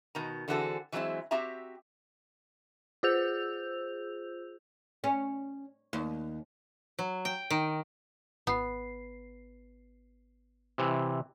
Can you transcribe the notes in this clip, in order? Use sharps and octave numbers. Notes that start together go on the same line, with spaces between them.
B2 D#3 A#5
D3 E3 C4 F#4 G#4 A4
E3 F#3 G#3 A#3 C4 E4
C4 F#4 G4 E5 A#5
F4 G#4 C5 E6 G6 F7
C#4
D#2
F#3
G5
D#3
G#1 B3 C7
C3 E3